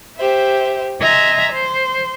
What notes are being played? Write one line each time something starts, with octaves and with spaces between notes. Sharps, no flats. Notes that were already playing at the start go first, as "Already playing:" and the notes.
G4 C5 E5
D#5 E5 G#5 A#5 C6
C5